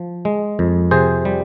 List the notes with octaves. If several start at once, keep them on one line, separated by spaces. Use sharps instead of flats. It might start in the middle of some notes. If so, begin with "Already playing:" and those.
Already playing: F3
G#3
F2
C3 G#4 C5
G3